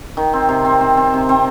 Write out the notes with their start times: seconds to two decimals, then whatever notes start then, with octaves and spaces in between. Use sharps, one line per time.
0.17 D#3
0.34 C4
0.49 C3
0.65 C4
0.81 C4
0.97 C4
1.14 C3
1.29 C4